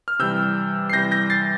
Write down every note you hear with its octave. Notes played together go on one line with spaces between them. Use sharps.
F6
C3 E3 G3 E6 G6
C7
C3 E3 G3 G6 A#6
G6 A#6
A6 C7